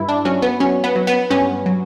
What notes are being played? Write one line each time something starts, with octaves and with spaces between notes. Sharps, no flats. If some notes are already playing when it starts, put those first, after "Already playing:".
Already playing: G2 E4
D4
F#3 C#4
B3
F#3 C#4
B3
F#3
B3
G2 C#4
F#3